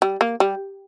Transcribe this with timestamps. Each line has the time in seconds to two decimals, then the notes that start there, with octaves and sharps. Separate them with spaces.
0.02 G3
0.21 A#3
0.40 G3